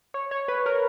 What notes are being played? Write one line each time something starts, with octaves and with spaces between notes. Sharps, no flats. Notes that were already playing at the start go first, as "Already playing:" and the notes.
C#5
C#5
B4
A#4